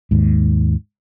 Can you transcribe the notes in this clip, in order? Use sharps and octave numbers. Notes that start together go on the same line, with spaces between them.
D#2 G#2